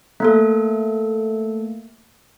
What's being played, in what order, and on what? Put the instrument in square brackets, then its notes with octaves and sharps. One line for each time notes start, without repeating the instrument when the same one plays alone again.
[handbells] A3 A#3 A4